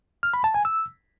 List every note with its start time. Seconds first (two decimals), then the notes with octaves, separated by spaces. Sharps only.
0.23 F6
0.34 B5
0.44 A5
0.54 G#5
0.65 E6